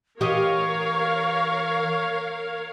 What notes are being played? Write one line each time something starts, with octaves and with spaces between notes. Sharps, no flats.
E3 G4 A#4 C#5 D#5 F5 C#6